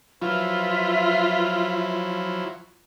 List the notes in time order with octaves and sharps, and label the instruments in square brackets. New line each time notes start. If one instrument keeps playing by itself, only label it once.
[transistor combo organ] F3 F#3 E4 [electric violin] F4 [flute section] B4 E5